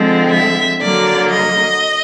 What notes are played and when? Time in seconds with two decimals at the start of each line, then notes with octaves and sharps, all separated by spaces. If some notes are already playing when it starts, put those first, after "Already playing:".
Already playing: D3 F3 G#3 C4
0.30 E5
0.80 D3 F#3 A#3 D5
1.30 D#5